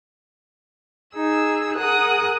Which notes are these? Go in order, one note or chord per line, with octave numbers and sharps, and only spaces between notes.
D#4 G#4 E6
G#4 A#4 F#5 D#6 F#6